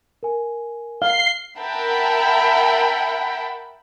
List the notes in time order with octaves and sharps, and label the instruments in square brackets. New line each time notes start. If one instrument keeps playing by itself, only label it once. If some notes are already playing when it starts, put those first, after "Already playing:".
[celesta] A#4 G#5
[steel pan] F5 [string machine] C7 [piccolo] G7
[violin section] A#4 E5 F#5 G5 A5 B5